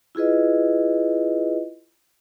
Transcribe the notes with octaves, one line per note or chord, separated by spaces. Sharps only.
E4 F4 G#4 B4 D#5